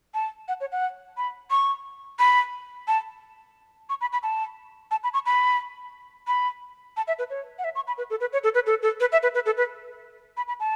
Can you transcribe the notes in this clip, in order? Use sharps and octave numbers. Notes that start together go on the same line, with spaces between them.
A5
F#5
C#5
F#5
B5
C#6
B5
A5
C#6
B5
B5
A5
A5
B5
C#6
B5
B5
A5
E5
B4
C#5
F#5
E5
C#6
B5
B4
A4
B4
C#5
A4
B4
A4
A4
B4
E5
B4
B4
A4
B4
B5
B5
A5